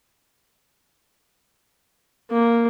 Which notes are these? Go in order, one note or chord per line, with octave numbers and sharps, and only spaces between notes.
A#3